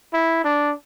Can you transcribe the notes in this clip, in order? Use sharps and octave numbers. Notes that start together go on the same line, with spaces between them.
E4
D4